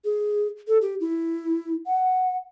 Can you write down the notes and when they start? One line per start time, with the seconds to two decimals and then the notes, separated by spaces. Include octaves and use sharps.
0.05 G#4
0.68 A4
0.82 G4
1.01 E4
1.87 F#5